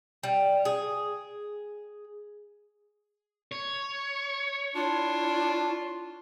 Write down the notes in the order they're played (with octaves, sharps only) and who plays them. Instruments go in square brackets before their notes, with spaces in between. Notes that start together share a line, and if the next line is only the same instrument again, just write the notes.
[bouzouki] G3
G#4
[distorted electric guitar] C#5
[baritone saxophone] D4 [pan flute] E4 [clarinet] F4